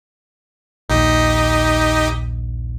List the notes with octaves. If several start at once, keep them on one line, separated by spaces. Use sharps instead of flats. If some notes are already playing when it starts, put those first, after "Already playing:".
A#1 D#2 D#4 G4 D#5